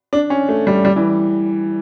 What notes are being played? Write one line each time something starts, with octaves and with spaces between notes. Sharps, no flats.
D4
C#4
A3
G3
G3
E3